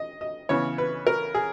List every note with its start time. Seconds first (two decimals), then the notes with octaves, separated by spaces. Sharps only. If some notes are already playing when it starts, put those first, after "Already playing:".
Already playing: D#5
0.21 D#5
0.49 C#3 E3 B3 C#5
0.78 B4
1.07 A#4
1.35 G#4